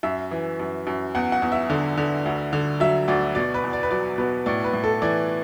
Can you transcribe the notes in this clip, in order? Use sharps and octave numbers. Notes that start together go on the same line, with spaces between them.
F#2 E5
E3
F#2
F#2
E2 F#5
F#5
E2
E5
D3
D3
D2
D3
F#3 E5
D2 D5
B2 D5
B4
E2
D5
B4
F#3 D5
B2 B4
A2 D5
B4
A2
A4
E3 D5